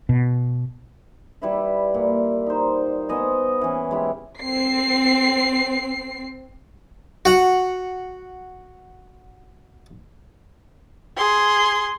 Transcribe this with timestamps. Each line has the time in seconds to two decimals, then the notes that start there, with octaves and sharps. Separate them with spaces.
0.09 B2
1.42 G3 E4 B4 E5
1.94 A#2
2.46 D#4 C5
3.09 B3 C5 D#5 G#5
3.61 E3 C#4
3.91 G#3 E4 G4
4.42 C4 C7
7.25 F#4 F#5
11.17 G#4 C6